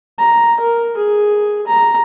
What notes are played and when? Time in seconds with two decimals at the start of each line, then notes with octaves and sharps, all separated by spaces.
0.19 A#5
0.60 A#4
0.97 G#4
1.67 A#5